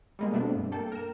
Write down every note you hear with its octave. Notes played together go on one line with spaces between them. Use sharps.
G3 G#3 A#3
B2 A3 B3 C4 D4
G2
A#3 A4 G5
A#4 E7